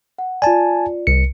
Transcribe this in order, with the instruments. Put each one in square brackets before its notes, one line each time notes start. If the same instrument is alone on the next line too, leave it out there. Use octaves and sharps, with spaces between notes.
[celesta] F#5
[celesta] F4 D5 [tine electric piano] G#5 A5
[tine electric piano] C2 C#7